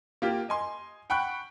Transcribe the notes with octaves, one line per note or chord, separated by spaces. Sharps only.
A#3 F4 G4
D#5 G#5 C6
F#5 G5 B5 C#6 F#6